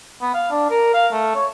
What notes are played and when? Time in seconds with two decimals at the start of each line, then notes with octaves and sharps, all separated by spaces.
0.21 B3
0.34 F5
0.51 D4
0.70 A#4
0.94 F5
1.12 A3
1.35 C#5